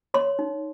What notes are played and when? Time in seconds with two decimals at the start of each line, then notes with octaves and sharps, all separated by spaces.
0.14 C#5 C6
0.39 D#4